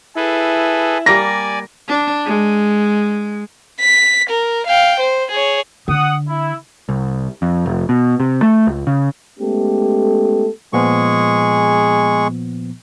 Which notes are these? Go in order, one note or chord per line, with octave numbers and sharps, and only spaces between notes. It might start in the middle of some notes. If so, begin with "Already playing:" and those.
E4 G#4 A4 B4
G3 A#3 D5 G#5 A#6
D4
G#3
B6
A#4
F5 G5
C5
G#4 C#5
D3 F#5 D#6
E4
C2
F2
F1
B2
C3
A3
C#2
C#3
G#3 A3 B3 C#4 G4 A4
A#2 F3 G#3 B3 G#4 C#6